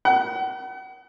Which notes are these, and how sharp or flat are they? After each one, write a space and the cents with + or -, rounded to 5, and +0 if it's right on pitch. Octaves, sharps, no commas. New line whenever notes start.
F#5 +40